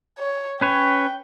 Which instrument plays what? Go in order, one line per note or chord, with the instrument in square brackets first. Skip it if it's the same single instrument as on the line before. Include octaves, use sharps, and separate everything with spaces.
[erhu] C#5
[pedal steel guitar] C#4 B4 C#5 [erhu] G5